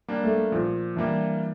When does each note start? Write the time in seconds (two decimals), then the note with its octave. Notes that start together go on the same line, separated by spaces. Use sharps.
0.08 G3 A#3 D4
0.23 A3
0.52 A#2 F3
0.96 E3 G3 A#3 D4